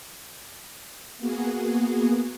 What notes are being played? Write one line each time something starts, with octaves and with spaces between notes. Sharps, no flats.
A#3 B3 F#4 G#4